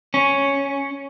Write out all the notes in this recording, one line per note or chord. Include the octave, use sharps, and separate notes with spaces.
C#4